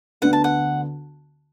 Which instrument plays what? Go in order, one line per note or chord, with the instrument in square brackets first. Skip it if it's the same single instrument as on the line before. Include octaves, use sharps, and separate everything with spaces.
[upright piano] D2 D3 B3 D4 [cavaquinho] F#5
[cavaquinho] A5
F#5